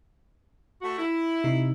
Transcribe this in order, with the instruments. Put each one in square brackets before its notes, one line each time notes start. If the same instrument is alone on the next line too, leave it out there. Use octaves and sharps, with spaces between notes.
[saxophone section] A3 F#4
E4
[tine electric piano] C3 D#4